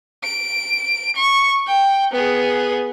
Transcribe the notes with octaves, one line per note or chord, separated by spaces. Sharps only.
D7
C#6
G5
B3 G#4